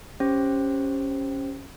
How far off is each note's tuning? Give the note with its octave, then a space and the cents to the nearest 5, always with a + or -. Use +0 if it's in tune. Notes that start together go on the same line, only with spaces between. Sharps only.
C#4 -5 G4 +10 C5 +0